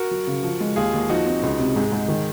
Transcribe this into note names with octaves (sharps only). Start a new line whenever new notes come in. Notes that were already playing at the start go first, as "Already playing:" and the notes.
Already playing: F#4 A#4
F#3
C#3
F3
G#3
D#2 F4 G#4
D#2
F3 D#4 F#4
C4
C#2
C3
G#2 G#3
G#2
D#3